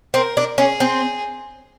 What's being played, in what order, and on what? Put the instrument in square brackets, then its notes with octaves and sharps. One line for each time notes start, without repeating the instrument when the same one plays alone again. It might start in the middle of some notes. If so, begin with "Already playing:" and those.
[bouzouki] C4 [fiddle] A#4
[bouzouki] D4
[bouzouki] C#4 [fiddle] G#4
[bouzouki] C4